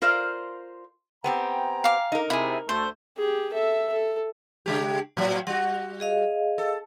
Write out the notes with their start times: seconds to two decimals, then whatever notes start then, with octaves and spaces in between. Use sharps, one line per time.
0.02 F4 A#4 C5 D5 F5
1.24 B3 C4 G4 G5 G#5 A#5
1.84 F5 D6
2.12 D#4 A#4
2.30 C3 E4 G#4
2.69 D2 A3 C5
3.17 G4 G#4
3.53 A4 E5
3.92 A4
4.66 C#3 G#3 G4
5.17 A2 F#3
5.47 G3 F#4 F#5
6.00 G#4 D#5 F5
6.58 A4